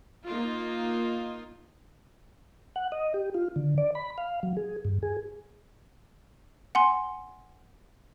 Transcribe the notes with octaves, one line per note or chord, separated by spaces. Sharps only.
A#3 D#4 F4
F#5
D#5
G4
F4
D3
D5
B5
F5
F#3
G#4
G2
G#4
F#5 G#5 C6